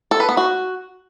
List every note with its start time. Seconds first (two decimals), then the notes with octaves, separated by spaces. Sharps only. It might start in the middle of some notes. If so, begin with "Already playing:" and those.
0.11 A4
0.20 B4
0.29 B3
0.37 F#4